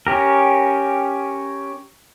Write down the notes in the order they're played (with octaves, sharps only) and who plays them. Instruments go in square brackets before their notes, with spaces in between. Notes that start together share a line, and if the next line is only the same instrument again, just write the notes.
[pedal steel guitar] C#4 G4 A#4